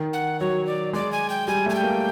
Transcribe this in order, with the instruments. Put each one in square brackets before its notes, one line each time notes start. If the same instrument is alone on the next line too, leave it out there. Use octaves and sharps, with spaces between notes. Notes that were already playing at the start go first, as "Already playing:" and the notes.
Already playing: [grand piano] D#3
[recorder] F#5
[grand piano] F#3 [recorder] C#5
[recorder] D5
[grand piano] G#3 [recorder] D5
[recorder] G#5
G5
[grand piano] G3 [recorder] G#5
[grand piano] A3
[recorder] G#5
G5
[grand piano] A#3